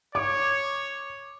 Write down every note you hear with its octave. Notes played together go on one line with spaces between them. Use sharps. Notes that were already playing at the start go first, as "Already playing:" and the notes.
C#5 D6